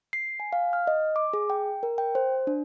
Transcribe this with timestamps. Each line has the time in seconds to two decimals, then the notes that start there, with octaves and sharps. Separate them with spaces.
0.13 C7
0.40 G#5
0.53 F5
0.73 F6
0.87 D#5
1.16 D6
1.33 G#4
1.50 G5
1.83 A#4
1.98 G5
2.15 C5
2.47 D4